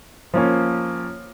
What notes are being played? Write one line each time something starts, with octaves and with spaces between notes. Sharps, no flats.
F3 A#3 C#4